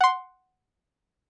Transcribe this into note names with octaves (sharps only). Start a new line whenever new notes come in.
F#5 C6